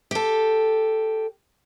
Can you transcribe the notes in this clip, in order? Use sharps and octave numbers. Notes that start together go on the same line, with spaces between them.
G4 A4